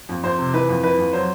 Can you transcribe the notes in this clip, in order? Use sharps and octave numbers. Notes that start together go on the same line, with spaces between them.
F2
F2 C5
C3
E3 B4
F2
E3 B4
F2
F#3 C5